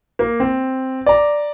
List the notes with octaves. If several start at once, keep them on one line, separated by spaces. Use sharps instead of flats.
A#3
C4
D5 A#5